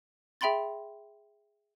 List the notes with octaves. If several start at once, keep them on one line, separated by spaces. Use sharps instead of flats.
G#4 E5 G5 B5 C6 A6